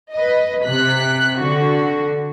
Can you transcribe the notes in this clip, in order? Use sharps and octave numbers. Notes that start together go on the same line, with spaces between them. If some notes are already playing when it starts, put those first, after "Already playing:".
B4 D#5
C3 F#6 B6
D3 F#4